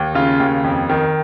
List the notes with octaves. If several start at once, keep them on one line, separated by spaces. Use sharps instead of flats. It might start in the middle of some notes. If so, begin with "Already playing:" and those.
Already playing: D#2
C#3 F4
D#2
F2
D#3